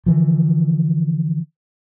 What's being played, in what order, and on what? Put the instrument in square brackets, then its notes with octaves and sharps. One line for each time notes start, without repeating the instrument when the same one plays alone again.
[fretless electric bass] D3 E3 F3